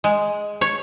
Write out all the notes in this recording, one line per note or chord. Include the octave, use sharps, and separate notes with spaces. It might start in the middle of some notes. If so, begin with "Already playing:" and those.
G#3
C#5